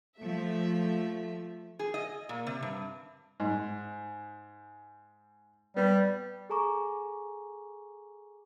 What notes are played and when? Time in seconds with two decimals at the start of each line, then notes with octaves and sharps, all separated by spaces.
0.19 F3 A3 E5
1.79 G#4
1.94 D#5
2.29 A#2
2.47 C3
2.62 G2
3.40 G#2
5.76 G3 B3
6.50 G#4 A4 G#5 A#5 C#6 D6